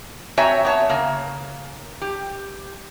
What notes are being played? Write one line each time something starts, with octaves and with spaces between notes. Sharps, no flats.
C4 F#4 C#5 E5 G#5 A#5
B3 C#5 A5
C#3 A#3
G4